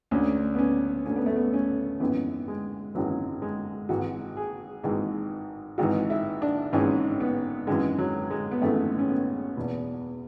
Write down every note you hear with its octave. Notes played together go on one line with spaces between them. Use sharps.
D2 D3 C#4
B3
C#4
D2 D3 C#4
B3
A3
B3
C#4
G#1 F#2 E3 B3
G#3
G#1 F#2 E3 F#3
G#3
G#1 G#2 E3 F#4
G#4
G#1 G#2 E3
G#1 G#2 E3 F#4
E4
D4
G#1 G#2 E3 C#4
B3
G#1 F#2 E3 G#3
F#3
G#3
B3
G#1 F#2 E3 A3
C#4
B3
E2 B2